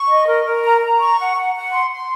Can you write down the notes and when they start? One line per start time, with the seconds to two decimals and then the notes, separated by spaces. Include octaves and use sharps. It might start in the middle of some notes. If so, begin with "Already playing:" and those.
Already playing: C#6
0.09 D#5
0.27 A#4
0.45 A#4
0.63 A#5
0.81 A#5
0.99 C#6
1.18 F#5
1.36 F#5
1.54 F#5
1.73 C6
1.91 C6